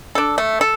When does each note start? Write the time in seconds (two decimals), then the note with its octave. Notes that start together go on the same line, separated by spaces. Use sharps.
0.15 D4 A4
0.38 A3
0.61 A4